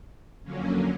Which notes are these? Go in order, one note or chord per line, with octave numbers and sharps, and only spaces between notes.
F2 D3 F#3 A#3 C#4